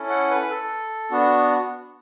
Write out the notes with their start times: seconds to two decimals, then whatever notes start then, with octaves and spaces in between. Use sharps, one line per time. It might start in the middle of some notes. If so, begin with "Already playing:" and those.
Already playing: C#4 E4 A4
0.10 F#5
0.30 B4
0.50 A4
1.11 B3 D4 F#4